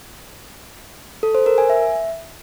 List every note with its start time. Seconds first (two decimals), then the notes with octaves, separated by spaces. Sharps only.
1.23 A4
1.35 C5
1.46 A#4
1.58 G#5
1.70 E5